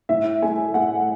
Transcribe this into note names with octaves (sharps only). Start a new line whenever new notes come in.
A2 E5
A3 G#5
A3 F#5